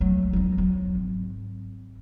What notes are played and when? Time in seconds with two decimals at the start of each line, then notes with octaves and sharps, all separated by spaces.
0.01 F#3 A3
0.33 E2 D#4
0.58 F3 F#3
0.95 G#1